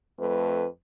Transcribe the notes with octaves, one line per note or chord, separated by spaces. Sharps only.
F2 A3 B4